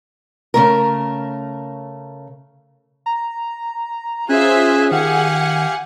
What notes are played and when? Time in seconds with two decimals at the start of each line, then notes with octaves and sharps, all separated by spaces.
0.54 C#3 A3 A#4
3.06 A#5
4.29 C#4 F4 G#4 C5 E5 G#5 F#6
4.91 D#3 G4 F5 F#5 G#5